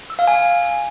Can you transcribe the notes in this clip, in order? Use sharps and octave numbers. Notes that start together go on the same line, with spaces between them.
E6
F5
G#5